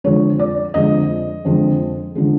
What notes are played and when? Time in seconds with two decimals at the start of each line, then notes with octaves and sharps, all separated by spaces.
0.04 F2 D3 F3 G#3 C#5
0.39 D5
0.74 F2 D3 F3 G#3 D#5
1.45 F2 D3 F3 G#3
2.15 D3 F3 G#3